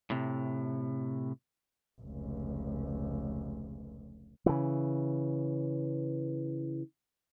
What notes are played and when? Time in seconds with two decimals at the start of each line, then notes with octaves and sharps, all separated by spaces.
0.10 A2 C3
2.01 F1 C#2
4.46 C#3 E3